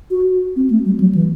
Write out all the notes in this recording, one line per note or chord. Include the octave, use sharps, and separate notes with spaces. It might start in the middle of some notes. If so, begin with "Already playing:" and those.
F#4
C4
A3
G3
F#3
E3